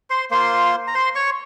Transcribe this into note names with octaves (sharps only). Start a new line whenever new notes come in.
C5 C6
A#3 F4 C5 C6
A#5
C5 C6
C#5 C#6